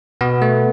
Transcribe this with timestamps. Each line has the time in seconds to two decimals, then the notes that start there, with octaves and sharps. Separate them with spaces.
0.21 B2 B3
0.42 A3